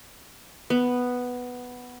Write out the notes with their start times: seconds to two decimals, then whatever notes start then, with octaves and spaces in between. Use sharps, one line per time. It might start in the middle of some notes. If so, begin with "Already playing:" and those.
0.70 B3